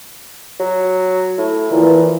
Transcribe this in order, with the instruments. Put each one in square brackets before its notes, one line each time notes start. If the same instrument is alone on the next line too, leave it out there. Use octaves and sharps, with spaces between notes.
[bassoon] F#3
A2
[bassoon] A#2 [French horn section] E3 F3